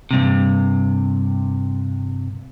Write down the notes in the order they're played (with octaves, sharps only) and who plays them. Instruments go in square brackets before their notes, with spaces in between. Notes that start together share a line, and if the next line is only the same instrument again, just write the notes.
[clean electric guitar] G2 C3